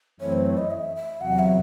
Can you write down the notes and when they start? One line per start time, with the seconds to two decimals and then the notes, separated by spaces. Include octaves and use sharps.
0.20 F#2 E3 A3 C4 E4 C#5
0.32 C5
0.46 C#5
0.58 D#5
0.71 E5
0.96 E5
1.21 E2 C3 F#3 F#5
1.39 E5